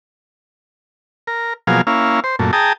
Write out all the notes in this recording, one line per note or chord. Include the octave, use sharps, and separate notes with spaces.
A#4
B2 F3 F#3 A#3 G#4 F5
A#3 C#4 E4 F5
C5
F#2 A#2 A3
G#4 G5 A5 A#5 D#6